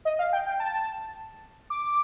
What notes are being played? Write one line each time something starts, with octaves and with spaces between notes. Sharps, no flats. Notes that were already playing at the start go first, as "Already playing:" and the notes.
D#5
F5
G5
G5
A5
D6